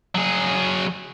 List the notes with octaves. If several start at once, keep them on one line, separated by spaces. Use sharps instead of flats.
F#3 G#4